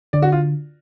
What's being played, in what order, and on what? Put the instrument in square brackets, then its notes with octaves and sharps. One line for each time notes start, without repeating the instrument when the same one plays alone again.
[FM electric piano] D3 [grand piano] D5
[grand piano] F#4
F4